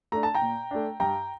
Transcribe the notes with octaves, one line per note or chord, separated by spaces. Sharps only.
A3 D4 A#5
A5
G5 A#5
A#2
A3 D4
G2 G5 A#5